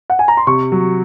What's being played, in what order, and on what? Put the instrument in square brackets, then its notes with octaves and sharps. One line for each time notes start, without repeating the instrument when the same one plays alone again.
[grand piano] F#5
G#5
A#5
C6
[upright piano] C3 [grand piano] C#6
[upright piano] F#3